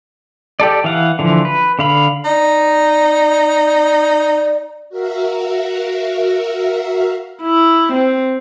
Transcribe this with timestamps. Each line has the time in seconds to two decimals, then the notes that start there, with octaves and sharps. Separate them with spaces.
0.60 G4 A4 D5
0.84 E3 F5 F#5
1.19 D3 E3 F3
1.45 B4
1.79 D3 F5 B5
2.25 D#4 D5
4.89 F#4 A#4 E5 F5
7.43 E4
7.93 C4